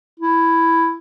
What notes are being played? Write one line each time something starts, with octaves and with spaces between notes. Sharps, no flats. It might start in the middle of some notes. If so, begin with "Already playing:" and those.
E4